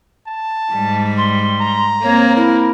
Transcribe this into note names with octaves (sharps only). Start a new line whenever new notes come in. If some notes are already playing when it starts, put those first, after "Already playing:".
A5
G#2 G3
C6
A#5
A#3 C4 C#5
E4 A#4